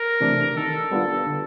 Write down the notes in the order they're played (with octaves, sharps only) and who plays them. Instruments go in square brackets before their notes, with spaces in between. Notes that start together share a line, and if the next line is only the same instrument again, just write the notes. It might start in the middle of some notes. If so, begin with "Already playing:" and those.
Already playing: [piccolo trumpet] A#4
[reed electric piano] C3 E3 A3 D4
[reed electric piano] D#3 [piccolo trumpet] A4
[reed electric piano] G3 B3 D4 F4
D3